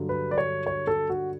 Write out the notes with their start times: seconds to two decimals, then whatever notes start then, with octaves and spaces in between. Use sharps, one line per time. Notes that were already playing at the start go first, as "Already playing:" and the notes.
Already playing: G2 D3 F#3
0.09 B4
0.31 D5
0.38 C#5
0.66 C#5
0.87 A4
1.10 F#4